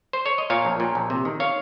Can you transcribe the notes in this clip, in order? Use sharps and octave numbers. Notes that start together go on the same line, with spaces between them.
C5
C#5
D#5
A#2 C#5 F5
A#1
A#2
A#1
C3
D#3
C#5 F5